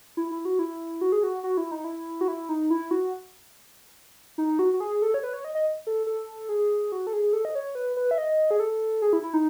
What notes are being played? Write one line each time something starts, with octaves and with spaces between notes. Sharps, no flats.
E4
E4
F#4
E4
F#4
G#4
F#4
F#4
E4
D#4
E4
F#4
E4
D#4
E4
F#4
D#4
F#4
F#4
G#4
A4
C#5
B4
C#5
D#5
D#5
A4
A4
G#4
F#4
A4
G#4
A4
D#5
C#5
B4
B4
E5
D#5
G#4
A4
G#4
E4
E4
D#4